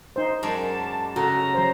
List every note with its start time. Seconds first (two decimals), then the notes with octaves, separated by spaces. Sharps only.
0.16 D#4 C5
0.43 F#2 G#3 D5 A5
1.16 C#3 F#4 A4 A#5
1.54 F#3 C5